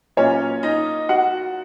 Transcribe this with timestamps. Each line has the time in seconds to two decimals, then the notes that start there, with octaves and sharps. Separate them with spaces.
0.17 A#2 F#3 A#3 C#4 C#5
0.63 D#4 D#5
1.09 F#4 F#5